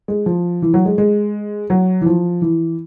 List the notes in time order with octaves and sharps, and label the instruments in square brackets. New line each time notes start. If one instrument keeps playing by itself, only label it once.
[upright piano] G#3
F3
E3
F#3
G#3
G#3
F#3
E3
F3
E3